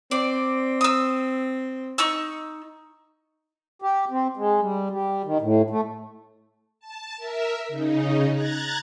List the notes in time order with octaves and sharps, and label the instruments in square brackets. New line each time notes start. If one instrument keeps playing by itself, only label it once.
[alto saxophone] C4 [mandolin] D5
[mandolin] D#6 E6
D#4 C#6 E6
[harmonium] G4
C4
G#3
G3
G3
D#3
A2
A3
[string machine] A5
A#4 E5
C#3 D#4
A#5 F#6 G#6 A6